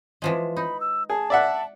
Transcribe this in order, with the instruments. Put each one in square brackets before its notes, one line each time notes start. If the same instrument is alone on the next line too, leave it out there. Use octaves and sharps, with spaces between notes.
[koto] E3 F3 G#3
[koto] D#4 [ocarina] B5
[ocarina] E6
[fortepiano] G#4 [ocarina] A5
[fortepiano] D5 E5 F#5